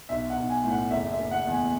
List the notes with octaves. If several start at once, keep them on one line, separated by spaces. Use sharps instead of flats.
B1 E5
F#5
B1
G#5
A2
F#5
F#1 E5
E5
F#1
F#5
E2
G#5